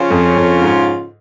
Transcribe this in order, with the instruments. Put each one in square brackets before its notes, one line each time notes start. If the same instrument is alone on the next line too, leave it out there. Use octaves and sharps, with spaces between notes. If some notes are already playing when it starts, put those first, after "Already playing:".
Already playing: [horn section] C#3 F3 C#4 F4
[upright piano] F2
F2
G#2